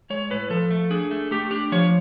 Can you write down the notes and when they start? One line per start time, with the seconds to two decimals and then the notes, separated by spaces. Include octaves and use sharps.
0.10 G#3 C#5
0.30 A2 B4
0.50 F3 A4
0.71 A3
0.91 D4 G#4
1.11 A3
1.31 A3 G4
1.51 D4 G4
1.72 F3 C#5